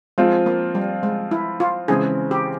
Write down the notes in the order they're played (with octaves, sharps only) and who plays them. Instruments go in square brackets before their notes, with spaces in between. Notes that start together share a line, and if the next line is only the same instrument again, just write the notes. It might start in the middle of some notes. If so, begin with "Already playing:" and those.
[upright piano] F3 C4 F4 [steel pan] G#3
[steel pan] A#3
G3
G#3
E4
F4
[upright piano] C#3 E3 G#3 C4 [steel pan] G#4
[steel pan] G4